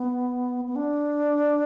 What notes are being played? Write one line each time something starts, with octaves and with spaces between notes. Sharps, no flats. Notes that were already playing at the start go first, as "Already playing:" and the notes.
Already playing: B3
B3
D4